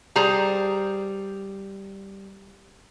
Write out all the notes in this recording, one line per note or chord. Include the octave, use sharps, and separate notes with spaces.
G3 G#4 C5 A#5